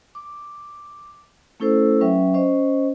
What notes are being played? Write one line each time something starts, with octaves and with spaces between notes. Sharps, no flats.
D6
A3 C#4 E4 A4 C5 E6
F#3 C#4 B4 E5 G5
C#4 C5 D#5